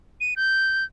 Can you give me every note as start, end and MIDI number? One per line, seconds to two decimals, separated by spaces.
0.21 0.34 99
0.36 0.84 91